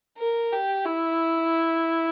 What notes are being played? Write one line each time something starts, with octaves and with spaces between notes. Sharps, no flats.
A#4
G4
E4